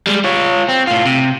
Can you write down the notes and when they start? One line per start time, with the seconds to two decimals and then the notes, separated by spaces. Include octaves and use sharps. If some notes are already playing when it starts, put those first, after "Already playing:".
0.07 G3 G#3
0.24 F4 C#5
0.69 C4
0.87 A2 F4
1.05 C3